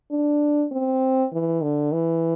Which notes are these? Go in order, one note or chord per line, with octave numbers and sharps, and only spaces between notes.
D4
C4
E3
D3
E3